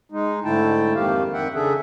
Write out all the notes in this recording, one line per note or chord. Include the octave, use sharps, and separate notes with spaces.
G#3 D#4
G#2 D3 A3 E4 G5 A5
F2 D#3 A#3 G4 F5
F2 D#3 E5 F#5 G5
C#3 D4 G#4 A4 E5